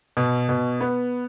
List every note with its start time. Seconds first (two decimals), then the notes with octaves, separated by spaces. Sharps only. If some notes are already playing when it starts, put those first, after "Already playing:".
0.17 B2
0.49 B2
0.81 B3